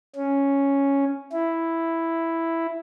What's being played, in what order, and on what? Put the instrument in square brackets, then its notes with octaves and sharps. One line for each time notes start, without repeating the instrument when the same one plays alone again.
[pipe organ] C#4
E4